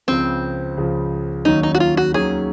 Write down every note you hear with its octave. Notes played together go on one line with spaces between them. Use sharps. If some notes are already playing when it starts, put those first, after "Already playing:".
C#2 C#3 F3 C4
C#2 C#3 F3
D#2 D#3 F#3 C#4 D#4
D#4
F#4
F4
F#4
D#2 D#3 F#3 C#4 G#4